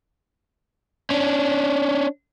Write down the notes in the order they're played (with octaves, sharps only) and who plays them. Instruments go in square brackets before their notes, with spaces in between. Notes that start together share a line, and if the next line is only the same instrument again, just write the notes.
[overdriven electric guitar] C#4 D4